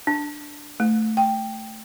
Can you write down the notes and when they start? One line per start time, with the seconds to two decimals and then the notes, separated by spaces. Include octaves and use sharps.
0.07 D4
0.80 A3
1.17 G5